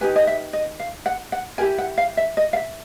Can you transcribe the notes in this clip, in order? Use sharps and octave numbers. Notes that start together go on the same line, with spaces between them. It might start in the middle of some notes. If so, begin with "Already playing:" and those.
D#4 G4 B4 G#5
D#5
E5
D#5
F5
F#5
F#5
E4 G4 A#4 G#5
F#5
F5
E5
D#5
F5
E5